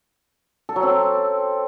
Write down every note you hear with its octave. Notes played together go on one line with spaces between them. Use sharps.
A4
F#3
C4